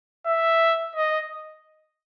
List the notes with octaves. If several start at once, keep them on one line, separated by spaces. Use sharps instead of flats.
E5
D#5